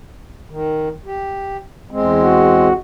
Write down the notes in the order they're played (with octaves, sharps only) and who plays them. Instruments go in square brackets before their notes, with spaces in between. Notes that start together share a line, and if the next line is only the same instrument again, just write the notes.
[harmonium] D#3
G4
E2 G#3 C4
[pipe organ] F#4